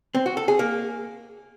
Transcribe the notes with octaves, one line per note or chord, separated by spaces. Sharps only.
C4
F#4
A4
G#4
A#3